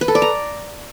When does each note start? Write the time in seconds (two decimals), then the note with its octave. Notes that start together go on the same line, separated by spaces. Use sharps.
0.01 B4
0.08 A4
0.15 D5
0.22 A#5